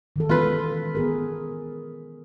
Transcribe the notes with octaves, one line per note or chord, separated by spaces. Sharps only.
D#3 E3 A4
G#3 B3 C#4 F4 B4
B3 G#4 A#4